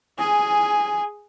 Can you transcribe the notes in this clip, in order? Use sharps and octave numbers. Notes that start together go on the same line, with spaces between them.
G#4 G#5